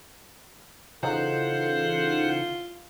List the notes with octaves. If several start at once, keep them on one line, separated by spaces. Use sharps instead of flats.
C#3 E3 D#4 F4 A4 C5 F#5